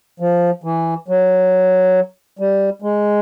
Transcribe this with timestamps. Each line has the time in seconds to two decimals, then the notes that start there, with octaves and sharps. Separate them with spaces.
0.20 F3
0.64 E3
1.08 F#3
2.39 G3
2.82 G#3